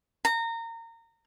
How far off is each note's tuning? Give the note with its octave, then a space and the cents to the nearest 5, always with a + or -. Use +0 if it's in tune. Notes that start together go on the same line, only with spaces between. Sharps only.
A#5 -25